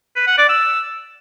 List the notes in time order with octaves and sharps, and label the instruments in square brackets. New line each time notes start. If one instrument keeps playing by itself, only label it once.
[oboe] B4
F#5
D5
E6